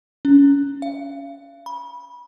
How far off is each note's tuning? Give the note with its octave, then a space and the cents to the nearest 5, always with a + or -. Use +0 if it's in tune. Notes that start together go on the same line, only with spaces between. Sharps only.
C#4 +25
F5 -40
B5 -25